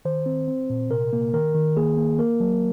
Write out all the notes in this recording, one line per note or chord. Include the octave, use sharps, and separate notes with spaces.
D#3 C5
C4
C4
A#2
C3 A#4
A#3
D#3 A#4
D#3
A#3 G#4
A#3
A#3 A#4
F#3